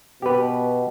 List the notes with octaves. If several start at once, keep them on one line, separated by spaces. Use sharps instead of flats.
B2 G4 B4